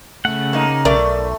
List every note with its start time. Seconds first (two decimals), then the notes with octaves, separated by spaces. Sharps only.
0.25 C#3 A3 F#5
0.53 A#3 D#4
0.85 B1 A3 A#4 D5